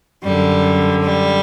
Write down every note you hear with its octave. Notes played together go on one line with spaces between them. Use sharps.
F#2 D3 G3
G3